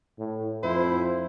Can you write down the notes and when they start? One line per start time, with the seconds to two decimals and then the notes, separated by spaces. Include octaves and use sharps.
0.19 A2
0.63 F2 E4 C5